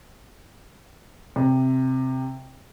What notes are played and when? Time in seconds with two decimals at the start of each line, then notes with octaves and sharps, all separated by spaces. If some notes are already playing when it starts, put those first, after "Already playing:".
1.36 C3